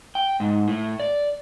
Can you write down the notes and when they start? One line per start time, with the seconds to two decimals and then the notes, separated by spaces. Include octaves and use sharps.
0.15 G5
0.40 G#2
0.68 A2
1.00 D5